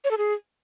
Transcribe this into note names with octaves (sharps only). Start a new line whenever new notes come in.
C#5
A4
G#4